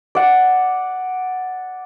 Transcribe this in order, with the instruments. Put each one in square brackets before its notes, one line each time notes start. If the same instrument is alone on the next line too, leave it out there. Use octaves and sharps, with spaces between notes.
[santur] D5 F#5